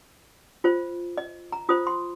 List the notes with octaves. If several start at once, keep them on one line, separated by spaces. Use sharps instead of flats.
F4 C5
D#5
A#5
F4 C5 D#6
C6